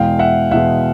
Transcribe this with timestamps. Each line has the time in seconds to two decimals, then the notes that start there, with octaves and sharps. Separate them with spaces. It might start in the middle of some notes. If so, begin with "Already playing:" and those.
Already playing: E2 B2 G#3 F5 G5
0.19 E5 F#5
0.51 E2 B2 G#3 E5 F#5